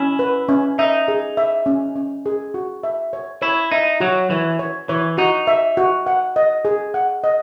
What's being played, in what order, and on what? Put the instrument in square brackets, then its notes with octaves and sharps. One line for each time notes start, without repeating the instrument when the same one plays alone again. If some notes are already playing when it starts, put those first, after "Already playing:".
Already playing: [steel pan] C#4 [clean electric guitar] E4
[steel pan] B4
C#4
[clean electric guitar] D#4 [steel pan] E5
[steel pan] G#4
E5
C#4
C#4
G#4
F#4
E5
C#5
[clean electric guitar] E4 [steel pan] C#5
[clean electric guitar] D#4 [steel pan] E5
[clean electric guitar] F#3 [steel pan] F#4
[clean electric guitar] E3 [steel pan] C#5
[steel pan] C#5
[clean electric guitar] E3 [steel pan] C#5
[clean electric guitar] D#4 [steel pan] F#4
[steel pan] E5
F#4
F#5
D#5
G#4
F#5
D#5